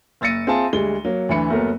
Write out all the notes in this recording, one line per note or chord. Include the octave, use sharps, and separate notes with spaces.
F#1 E6 A6 A#6 C#7 D#7
C4 F4 G#4 E5 G#5 A5
D2 G3 G#3 G7
F#3 A#3
D2 D3 E3 B5 C#7
F#1 F#3 A3 B3 A#4